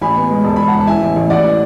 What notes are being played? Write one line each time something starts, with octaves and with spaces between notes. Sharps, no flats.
A1 G#5 B5
B3
G#3
E1 A5
E1 B5
F#5 A5
E1
A5
E3 E5 G#5
A1
A1
A1 D5 F#5
E3